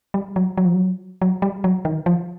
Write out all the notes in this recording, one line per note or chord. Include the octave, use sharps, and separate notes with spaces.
G3
F#3
F#3
F3
F#3
F#3
G3
F#3
D#3
F3